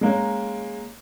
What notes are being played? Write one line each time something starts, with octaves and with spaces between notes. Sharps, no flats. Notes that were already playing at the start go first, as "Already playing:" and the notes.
G#3 A#3 C#4